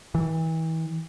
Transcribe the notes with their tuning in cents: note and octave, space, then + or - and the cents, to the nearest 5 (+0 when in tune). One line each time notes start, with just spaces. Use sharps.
E3 -35